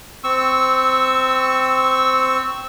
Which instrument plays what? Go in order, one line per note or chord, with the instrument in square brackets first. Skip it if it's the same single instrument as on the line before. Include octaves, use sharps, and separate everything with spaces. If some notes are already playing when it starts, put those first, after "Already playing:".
[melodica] C4 C#6 E6